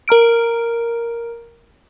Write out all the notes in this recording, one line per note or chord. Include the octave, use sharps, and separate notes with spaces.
A#4 A#5 F6 D7